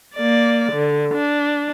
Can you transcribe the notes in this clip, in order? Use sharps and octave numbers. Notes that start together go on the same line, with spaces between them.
A#3 D5
D3
D4